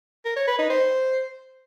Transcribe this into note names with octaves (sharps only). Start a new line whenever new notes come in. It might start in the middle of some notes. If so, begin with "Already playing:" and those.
A#4
C#5
B4
D#4
C5